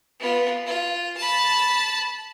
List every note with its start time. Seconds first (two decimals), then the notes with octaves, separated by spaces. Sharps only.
0.20 B3 F4
0.66 F4
1.17 A5 B5